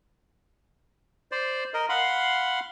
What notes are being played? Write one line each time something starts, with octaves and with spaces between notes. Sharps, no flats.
C5 D5
A#4 D#5
F5 F#5 B5 C6